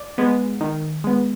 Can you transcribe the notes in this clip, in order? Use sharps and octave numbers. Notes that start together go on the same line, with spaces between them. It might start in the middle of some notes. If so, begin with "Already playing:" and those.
Already playing: D5
G#3 B3
D#3
G#3 B3